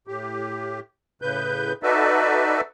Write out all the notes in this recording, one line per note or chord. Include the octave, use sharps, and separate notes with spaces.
A2 G4
A2 C#3 B4 G6
D#4 F#4 A4 B4 D5 E5